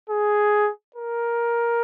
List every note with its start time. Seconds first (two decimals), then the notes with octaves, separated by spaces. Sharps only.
0.10 G#4
0.96 A#4